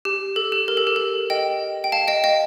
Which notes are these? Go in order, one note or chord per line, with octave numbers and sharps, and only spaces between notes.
G4
A4
G4
A#4
A4
G4
A4
D#5 G5
G5
F5 A5
D#5 G5
D#5 G5